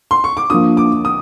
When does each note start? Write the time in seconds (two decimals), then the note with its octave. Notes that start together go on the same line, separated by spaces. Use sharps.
0.11 C6
0.24 C#6
0.37 D6
0.50 F3 A#3 D4 D#6
0.77 D6
1.05 D#6